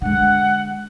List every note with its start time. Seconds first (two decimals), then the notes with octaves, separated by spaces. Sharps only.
0.02 D3 G#3 F#5